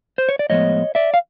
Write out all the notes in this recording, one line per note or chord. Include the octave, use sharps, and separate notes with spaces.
C5
C#5
D5
A2 F3 G#3 B3 C#5 D#5
D5 E5
F5